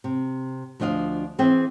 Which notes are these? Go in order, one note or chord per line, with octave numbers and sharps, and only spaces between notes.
C3
D2 F3 D4 D#5 F5
E3 C4 G#4 E5 G5